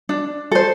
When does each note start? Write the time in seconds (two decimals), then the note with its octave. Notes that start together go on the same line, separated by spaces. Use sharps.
0.09 D4
0.51 A4 C5